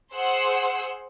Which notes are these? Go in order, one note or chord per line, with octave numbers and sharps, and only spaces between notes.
G#4 C5 F#5 C6 E6